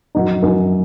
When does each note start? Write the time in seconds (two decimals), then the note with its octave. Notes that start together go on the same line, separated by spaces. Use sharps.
0.15 F#2 F#3 D#4
0.42 F#2 F#3 D#4